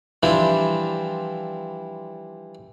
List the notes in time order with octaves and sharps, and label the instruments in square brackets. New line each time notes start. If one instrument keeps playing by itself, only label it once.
[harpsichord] E3 F3 G3 C4 D4 E4